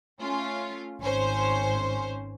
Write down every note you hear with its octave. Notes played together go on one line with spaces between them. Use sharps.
A3 C#4 F4
G#1 C#4 C5